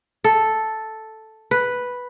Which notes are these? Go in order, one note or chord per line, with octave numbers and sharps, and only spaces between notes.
A4
B4